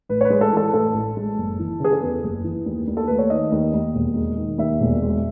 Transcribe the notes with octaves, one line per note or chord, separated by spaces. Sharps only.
A1 B4
C#5
B4
G#3
A4
E3 A4
A2 A4
A1
G#3
F#1
E3
C#3 G#4
A4
E2 B4
F#1
E3
D#2
D#2
A4
A3 B4
C#5
D#3 D#5
D#2
D#2
E1
G#3
D#3
D#2 E5
E1
G#3